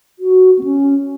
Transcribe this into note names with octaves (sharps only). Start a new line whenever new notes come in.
F#4
B3
C#4